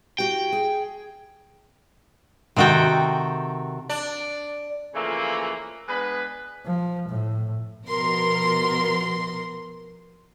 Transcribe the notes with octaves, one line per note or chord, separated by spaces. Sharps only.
E4 F#4 G4 G5
G#4
C3 D#3 F#4 A4 G5
D4
C#3 E3 F3 A3 A#3
G#3 B3 D4 B4
F3
A2
B2 F3 A#4 C6